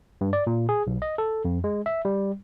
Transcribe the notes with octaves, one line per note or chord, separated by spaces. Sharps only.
G2
D5
A#2
G#4
B1
D#5
A4
F2
G#3
E5
G3